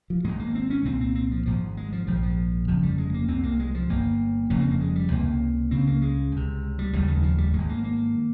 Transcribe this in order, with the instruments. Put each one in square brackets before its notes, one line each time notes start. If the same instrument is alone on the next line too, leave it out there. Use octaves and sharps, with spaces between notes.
[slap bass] F3
G#1 G#2 G#3
A#3
C4
C#4
C2 A#2 C4
C4
C4
F3
G#1 G#2 F3
G#3
F3
A#1 G#2 F3
F3
G1 F2 C#3 F3
G3
G#3
A#3
C2 C3 C4
A#3
G#3
F3
G1 G2 A#3
F1 F2 C#3 A#3
C4
A#3
G#3
G3
C#2 C3 A#3
C#2 C#3 C4
A#3
G#3
C#2 C3
G3
F1 D#2 C#3 G3
D#3
F3
G3
G#1 G#2 G#3
A#3
A#3